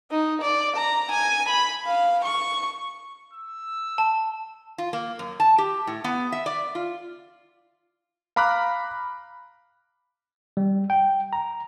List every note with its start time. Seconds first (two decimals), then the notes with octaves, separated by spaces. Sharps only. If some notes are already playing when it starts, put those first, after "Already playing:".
0.11 D#4
0.42 D5
0.77 A#5
1.12 G#5
1.49 B5
1.87 F5
2.25 C#6
3.33 E6
3.98 A5
4.78 F4
4.93 A#3
5.19 F#2
5.40 A5
5.58 G4
5.87 A2
6.04 B3
6.32 E5
6.46 D5
6.75 F4
8.36 F5 A#5 B5 D6 F6 F#6
10.57 G3
10.90 G5
11.33 A#5